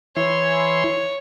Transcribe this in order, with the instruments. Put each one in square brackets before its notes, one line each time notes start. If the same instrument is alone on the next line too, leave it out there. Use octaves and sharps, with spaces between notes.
[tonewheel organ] E3 E4 C6 [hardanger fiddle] C#5